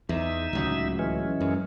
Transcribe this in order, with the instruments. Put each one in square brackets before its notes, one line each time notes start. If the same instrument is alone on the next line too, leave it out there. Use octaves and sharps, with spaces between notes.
[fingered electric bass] E2 [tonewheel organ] D#4 E5
[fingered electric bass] D1 C#2 F#3
[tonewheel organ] E3 G#3 C#4
[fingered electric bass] F#2